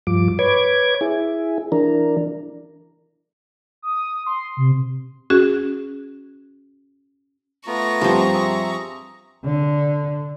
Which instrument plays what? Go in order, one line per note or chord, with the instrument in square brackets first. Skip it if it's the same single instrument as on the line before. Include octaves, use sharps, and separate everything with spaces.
[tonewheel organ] G2 F3 D6
B4 C#5 D6 G#6
E4 G#4
E3 D4 A#4
[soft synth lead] D#6
C6
C3
[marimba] C#4 F#4 G#4
[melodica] A3 B3 F4 [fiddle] A#5 C#6
[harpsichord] G2 [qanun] F3 C4
[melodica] G#4 E5
[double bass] D3